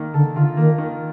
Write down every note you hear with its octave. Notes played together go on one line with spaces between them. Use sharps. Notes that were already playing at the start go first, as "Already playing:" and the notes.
Already playing: D#3 A#3
D3 A4
D3 F4
D#3 A#3
D#3